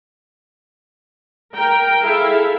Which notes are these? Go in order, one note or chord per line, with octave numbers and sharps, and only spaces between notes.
A#4 G5
E4 G#4 A4 E5 F5